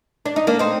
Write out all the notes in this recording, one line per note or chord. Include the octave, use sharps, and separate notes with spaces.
D4
D#4
A#3 D4
C4 D#4